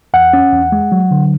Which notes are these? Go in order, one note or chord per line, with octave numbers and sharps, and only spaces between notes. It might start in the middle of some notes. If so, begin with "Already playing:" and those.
E2 F#5
C#4
E2
G#3
F#3
D3